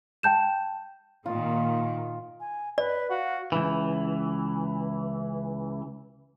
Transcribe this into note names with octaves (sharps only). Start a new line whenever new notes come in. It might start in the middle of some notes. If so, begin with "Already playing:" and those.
G5 A5 G6 E7
A#2 D#3 F4
G#5
B4 D5
F#4 F5
C#2 E3